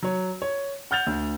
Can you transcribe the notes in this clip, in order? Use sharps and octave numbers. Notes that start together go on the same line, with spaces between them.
F#3 C#5
C#5
F#5 F6 G6 A6 F7
D2